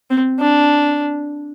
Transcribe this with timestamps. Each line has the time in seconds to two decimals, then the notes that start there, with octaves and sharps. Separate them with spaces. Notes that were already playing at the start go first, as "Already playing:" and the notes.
0.10 C4
0.40 D4